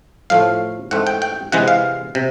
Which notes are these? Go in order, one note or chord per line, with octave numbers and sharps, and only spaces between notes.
A2 F3 A3 F5
G#2 E3 A3 C4 F#5
G5
G5
C3 E3 G#3 F#5
F5
C3